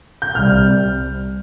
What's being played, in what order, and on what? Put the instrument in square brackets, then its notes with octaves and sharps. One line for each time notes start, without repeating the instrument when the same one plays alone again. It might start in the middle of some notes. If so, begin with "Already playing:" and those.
[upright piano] G6
[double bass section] C2 C3 G3 [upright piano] F6